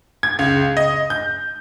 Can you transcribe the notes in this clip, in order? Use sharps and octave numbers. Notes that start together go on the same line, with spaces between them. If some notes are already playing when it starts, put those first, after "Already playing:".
G#6
C#2
D#5
G6